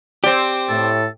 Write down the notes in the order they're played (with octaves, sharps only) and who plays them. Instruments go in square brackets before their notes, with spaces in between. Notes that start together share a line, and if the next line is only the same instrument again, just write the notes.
[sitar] C4 D5 [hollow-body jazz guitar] G4
[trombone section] A2 [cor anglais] A4